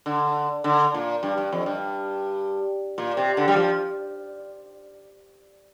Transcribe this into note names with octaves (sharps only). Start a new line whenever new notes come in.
D3
D3
A#2
G2
G2
F2
G2
A#2
C3
D3
G3
F3